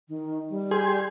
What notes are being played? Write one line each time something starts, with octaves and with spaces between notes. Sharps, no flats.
D#3
G3
G4 G#4 G#5 C6